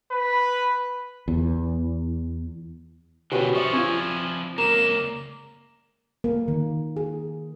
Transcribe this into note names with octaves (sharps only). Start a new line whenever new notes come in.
B4
E2
B2 D3 C#4 F#4 G4 B4 C#6
F3 E4 D5 E5 C#6
C4 F4 G#5
C#2 A#3 A#4 E7
A#3
D#3
G#4